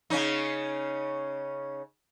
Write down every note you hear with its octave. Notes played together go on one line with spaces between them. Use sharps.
C#3 C#4 D#4